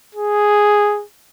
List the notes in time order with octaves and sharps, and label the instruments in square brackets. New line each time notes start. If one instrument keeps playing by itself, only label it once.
[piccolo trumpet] G#4